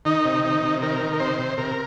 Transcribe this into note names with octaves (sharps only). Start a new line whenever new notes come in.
D#3 D#4
C3
D#3
C3
D#3 A#4
D#3
A#4
C3 C5
C3
C3 A#4